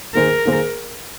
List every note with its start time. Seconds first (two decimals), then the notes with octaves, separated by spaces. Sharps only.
0.14 D#3 A#3 G#4 A#4 C5
0.45 D#3 A#3 G#4 C5